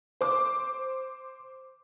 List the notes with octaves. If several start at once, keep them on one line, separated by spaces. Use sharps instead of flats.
C5 D6